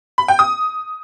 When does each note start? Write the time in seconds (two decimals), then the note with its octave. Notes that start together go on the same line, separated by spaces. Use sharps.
0.18 B5
0.28 G5
0.39 D#6